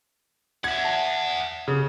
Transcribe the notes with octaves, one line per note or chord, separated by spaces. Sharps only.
E5 F#5 G#6
A5
C#3